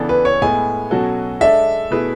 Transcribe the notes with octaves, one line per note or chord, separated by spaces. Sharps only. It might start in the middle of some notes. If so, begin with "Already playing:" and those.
Already playing: C#3 E3 B3 D4 A4
B4
C#5
A2 G#3 B3 G#5
B2 F#3 C#4 F#4 A4
G#3 D4 A4 D5 E5
B2 A3 E4 G#4 B4